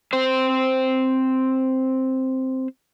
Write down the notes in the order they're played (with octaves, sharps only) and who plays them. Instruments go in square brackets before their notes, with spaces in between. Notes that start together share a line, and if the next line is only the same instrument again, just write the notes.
[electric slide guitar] C4 C5